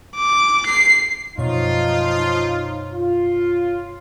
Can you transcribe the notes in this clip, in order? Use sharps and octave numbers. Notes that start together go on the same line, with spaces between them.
D6
C7
F#2 B2 F3 D#4 F4 C#5
F4